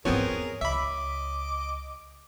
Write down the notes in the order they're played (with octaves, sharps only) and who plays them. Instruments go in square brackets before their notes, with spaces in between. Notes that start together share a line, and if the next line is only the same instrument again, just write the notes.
[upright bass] E2 G#2 [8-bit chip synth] F3 B3 C4 [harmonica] G#4 A#4 [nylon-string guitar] C#5
[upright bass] C#2 [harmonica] D#5 D6 [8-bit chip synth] E5 B5